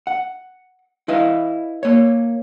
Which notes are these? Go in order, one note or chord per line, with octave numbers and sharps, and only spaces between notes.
F#5
E4 B4 D#5 F5
A#3 C#5